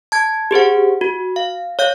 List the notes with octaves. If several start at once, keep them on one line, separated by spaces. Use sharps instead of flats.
A5 G#6
G4 G#4 C5 F#5
F#4
F5
C#5 F5 G6